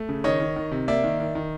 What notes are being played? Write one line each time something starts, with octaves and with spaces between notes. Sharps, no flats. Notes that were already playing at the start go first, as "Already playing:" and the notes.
Already playing: A3
C#3
D#3 C#5 D#5
D#3
D#3
C3
A#3 D5 E5
D#3
D#3
D#3